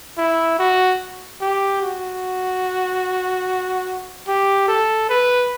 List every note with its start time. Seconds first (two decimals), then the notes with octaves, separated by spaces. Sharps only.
0.18 E4
0.59 F#4
1.41 G4
1.82 F#4
4.28 G4
4.68 A4
5.09 B4